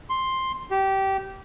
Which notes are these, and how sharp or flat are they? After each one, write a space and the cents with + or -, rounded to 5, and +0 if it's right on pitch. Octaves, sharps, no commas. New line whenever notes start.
C6 +5
G4 -20